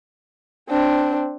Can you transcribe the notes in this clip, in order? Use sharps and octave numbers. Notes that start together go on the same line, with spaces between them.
C4 D4